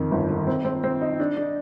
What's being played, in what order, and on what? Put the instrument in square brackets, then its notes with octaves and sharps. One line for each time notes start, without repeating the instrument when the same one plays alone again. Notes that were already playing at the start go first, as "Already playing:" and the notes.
Already playing: [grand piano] F2 D#3
G1
D#3
C4
C4
C4
D#4
D4
D4